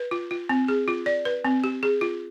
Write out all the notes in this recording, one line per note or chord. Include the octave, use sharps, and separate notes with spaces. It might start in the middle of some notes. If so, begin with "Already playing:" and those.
Already playing: B4
F4
F4
C4
G#4
F4
D5
B4
C4
G4
G#4
F4